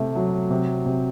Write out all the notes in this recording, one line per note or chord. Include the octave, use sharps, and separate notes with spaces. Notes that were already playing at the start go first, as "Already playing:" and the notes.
Already playing: C3 A3 E4
F#3
C3
C3